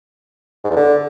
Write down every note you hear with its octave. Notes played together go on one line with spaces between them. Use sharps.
G#2
E2
D3